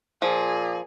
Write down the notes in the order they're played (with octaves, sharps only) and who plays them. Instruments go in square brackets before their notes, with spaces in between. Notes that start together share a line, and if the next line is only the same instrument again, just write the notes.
[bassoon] A#2 [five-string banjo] F3 [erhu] G#4